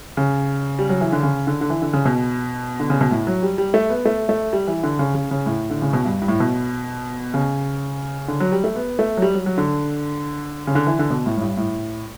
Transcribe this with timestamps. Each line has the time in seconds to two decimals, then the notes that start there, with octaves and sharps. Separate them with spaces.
0.17 C#3
0.79 G3
0.89 F#3
1.01 E3
1.12 D3
1.23 C#3
1.47 D3
1.61 D3
1.70 E3
1.82 D3
1.93 C#3
2.05 B2
2.80 D3
2.90 C#3
3.01 B2
3.11 A2
3.27 F#3
3.43 G3
3.58 G3
3.74 A3
3.90 B3
4.05 A3
4.29 A3
4.53 G3
4.67 E3
4.83 D3
4.99 C#3
5.15 C#3
5.31 C#3
5.46 A2
5.70 D3
5.82 C#3
5.93 B2
6.05 G2
6.22 G2
6.28 A2
6.40 B2
7.34 C#3
8.28 D3
8.40 F#3
8.52 G3
8.64 A3
8.76 B3
8.99 A3
9.17 F#3
9.22 G3
9.34 F#3
9.46 F#3
9.58 D3
10.67 C#3
10.75 D3
10.87 E3
10.99 D3
11.10 B2
11.26 A2
11.37 A2
11.41 G2
11.57 A2